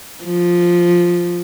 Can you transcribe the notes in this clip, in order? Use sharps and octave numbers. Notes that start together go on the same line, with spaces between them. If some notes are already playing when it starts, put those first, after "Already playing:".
F3